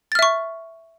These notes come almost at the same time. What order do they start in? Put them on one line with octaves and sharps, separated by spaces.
A6 F6 E5 C#6